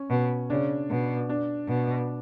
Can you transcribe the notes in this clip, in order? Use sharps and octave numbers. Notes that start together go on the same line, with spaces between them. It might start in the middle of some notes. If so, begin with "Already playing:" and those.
Already playing: C#4
B2
C#3 D4
B2
D4
B2